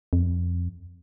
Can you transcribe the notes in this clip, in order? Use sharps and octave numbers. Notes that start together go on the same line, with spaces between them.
F2